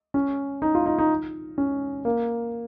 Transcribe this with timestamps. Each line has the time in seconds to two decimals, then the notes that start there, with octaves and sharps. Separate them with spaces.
0.14 C#4
0.62 D#4
0.75 F4
0.86 D#4
0.98 D#4
1.58 C#4
2.05 A#3